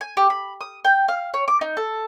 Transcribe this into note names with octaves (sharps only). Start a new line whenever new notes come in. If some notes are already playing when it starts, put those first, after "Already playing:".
G#5
G4
B5
D#6
G5
F5
C#5
D6
D#4
A4